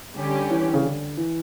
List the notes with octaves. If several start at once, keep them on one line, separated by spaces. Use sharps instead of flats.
D3 G3 C#4 G4
E3
C#3
D3
E3